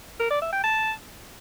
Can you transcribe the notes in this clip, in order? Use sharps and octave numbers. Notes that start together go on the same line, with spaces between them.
A#4
D5
E5
G5
A5